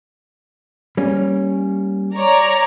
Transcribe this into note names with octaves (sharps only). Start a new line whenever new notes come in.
G3 A#3 C#4
C#5 D5 A#5